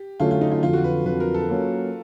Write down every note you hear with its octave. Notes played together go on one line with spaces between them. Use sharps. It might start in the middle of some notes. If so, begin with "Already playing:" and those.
Already playing: G4
D3 F#3 A3 C#4 F4
F4
D#4
F4
F2 D3 F#3 F4
F#4
B4
F2 D3 F#3 B4
A#4
A4
F#3 A#3 C#4